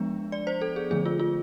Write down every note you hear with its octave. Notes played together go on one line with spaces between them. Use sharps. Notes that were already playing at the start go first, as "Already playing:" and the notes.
Already playing: F3 G#3 B3 D4
D5
C5
A4
G#4
D3 F3 A3 G#4
F4
F4